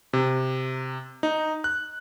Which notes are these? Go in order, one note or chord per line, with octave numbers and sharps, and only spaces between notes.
C3
D#4
F#6